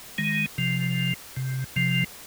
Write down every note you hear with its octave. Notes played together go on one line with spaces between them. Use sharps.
D#3 G#3
C3 F3
C3
C3 F3